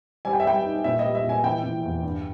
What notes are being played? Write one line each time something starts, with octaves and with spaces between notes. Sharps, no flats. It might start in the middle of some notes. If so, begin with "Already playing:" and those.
G3 G#5
G5
E5
G3 G5
D#4
A#2 E5
D#5
G3
E5
A#2
G#5
E3 G5
E3
E2
G2